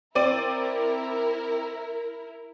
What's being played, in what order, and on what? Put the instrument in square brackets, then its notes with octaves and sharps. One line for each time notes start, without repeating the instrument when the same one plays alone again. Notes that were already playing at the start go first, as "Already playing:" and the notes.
[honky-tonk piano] C4 D5 D#7 [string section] E4 A#4